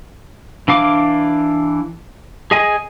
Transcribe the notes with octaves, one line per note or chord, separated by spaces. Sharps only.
E3 D4 F5 D6
G#4 D#5 G#5